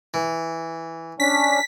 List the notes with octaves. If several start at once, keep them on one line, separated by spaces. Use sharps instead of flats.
E3
C#4 D4 B6